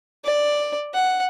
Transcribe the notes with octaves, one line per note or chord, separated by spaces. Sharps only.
D5
F#5